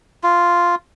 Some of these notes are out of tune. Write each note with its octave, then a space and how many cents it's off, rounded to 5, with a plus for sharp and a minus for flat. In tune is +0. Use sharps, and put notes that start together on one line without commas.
F4 -5